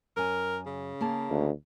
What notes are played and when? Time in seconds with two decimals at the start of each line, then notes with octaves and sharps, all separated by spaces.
0.17 F#2 A#4 G#5
0.66 C#3
1.01 A#3 G#4 A5
1.30 D2